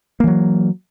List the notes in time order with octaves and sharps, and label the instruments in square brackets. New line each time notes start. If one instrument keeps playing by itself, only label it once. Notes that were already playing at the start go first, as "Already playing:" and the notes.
[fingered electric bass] A#3
E3
F#3